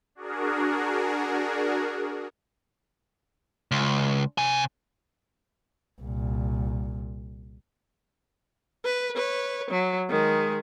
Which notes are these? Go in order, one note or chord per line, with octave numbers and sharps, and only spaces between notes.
D4 F#4 G#4 A#4
C#2
C3 G#5
C2 A#2
B4
B4 C#5
F#3
D#3 G#3